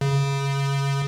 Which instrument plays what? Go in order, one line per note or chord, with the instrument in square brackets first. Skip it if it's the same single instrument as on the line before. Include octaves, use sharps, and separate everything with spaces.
[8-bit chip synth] C#3